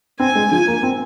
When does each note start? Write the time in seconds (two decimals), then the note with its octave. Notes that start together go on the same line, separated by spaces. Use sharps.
0.20 C4 G#5
0.35 G#3
0.51 F3 G#5
0.67 A#3
0.83 C4